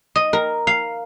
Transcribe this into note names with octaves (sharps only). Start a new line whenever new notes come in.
D#5
A#4
F5